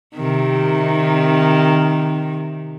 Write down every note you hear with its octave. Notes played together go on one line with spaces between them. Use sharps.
C3 D#3